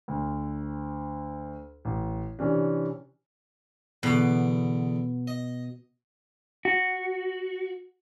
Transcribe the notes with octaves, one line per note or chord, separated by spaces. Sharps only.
D2
A1
C3 E3 C#4 D4
E2 B2 D3 D6
D#5
F#4